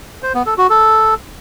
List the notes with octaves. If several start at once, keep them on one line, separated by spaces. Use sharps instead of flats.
C5
B3
A4
F#4
A4